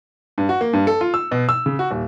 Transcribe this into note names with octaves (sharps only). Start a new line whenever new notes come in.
G2
F#4
A#3
G2
A4
F4
E6
B2
E6
C#3
F#4
D#1